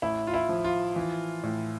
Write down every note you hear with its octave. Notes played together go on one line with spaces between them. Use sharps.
A1 E4
F4
E4
F3
F4
E3
A2